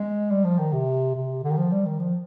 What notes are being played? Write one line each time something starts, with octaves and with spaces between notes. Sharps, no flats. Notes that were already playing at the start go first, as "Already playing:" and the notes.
Already playing: G#3
G3
F3
D#3
C3
C3
D3
D#3
F3
G3
D#3
F3